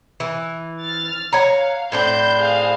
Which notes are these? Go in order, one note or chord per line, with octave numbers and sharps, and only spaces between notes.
E3
F6 A6
C#5 F5 F#5 A#5
A2 C4 D4 G6
G#4 F5